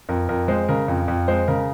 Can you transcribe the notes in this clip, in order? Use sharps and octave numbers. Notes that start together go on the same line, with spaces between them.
F2 A#4
F2 A#4
G#3 C5
C#3 A#4
F2
F2
G#3 C5
C#3 A#4